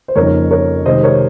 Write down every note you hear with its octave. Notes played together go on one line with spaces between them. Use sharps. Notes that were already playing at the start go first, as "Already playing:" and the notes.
C5
F2 C#3 F3 A#3 D#4 A#4 C#5
A#4 C#5
C3 D#3 G#3 C4 C5 D#5
A#4 C#5